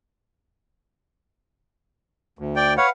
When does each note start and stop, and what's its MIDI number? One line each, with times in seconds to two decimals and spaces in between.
2.39 2.76 38
2.56 2.74 74
2.56 2.74 79
2.77 2.89 71
2.77 2.86 73
2.77 2.89 77
2.77 2.89 78